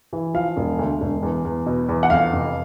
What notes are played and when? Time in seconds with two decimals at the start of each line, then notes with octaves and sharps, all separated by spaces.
0.13 E3
0.34 F3 F5
0.57 E1
0.79 D2
1.01 E1
1.23 E2
1.45 E2
1.66 B2
1.89 E2
2.03 F#5
2.10 F2 F5
2.33 F1